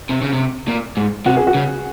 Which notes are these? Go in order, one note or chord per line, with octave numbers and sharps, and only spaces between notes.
C3
C#3
C3
A#2
G#2
C3 F#4
G#4
F#4
C#3